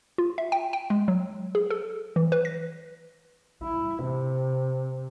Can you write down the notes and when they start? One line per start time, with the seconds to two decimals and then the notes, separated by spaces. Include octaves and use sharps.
0.18 F4
0.38 E5
0.52 G5
0.73 G5
0.90 G#3
1.08 F#3
1.55 G#4
1.70 A4
2.16 E3
2.32 B4
2.45 A#6
3.63 E4
4.03 C3